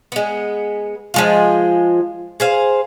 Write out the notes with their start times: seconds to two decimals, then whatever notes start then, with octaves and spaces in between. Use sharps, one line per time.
0.12 G#3 B3
1.14 F3 G#3 F4
2.40 G#4 C5 F5